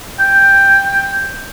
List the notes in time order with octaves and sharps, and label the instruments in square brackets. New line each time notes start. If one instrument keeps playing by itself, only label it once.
[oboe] G5